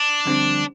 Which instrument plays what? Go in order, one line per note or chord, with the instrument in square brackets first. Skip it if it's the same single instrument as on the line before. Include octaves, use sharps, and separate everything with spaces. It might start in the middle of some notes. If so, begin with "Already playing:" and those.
Already playing: [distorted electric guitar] D4
[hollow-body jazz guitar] F2 D3 G3 C4